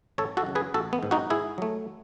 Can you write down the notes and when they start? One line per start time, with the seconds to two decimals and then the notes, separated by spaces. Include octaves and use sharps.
0.18 G#1 A4 C#5
0.37 F#4 A4
0.46 F#2 C#3
0.55 G#4 B4
0.74 A1 F#4 A4
0.93 B3
1.03 G#2 D#3
1.11 D#4 F#4
1.30 G#2 E4 G#4
1.58 F#3 A3